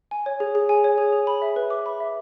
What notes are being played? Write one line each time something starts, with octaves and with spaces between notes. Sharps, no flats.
G#5
C#5
G#4
G#4
G#5
C#5
G#4
G#4
B5
E5
B4
D6
B5
E5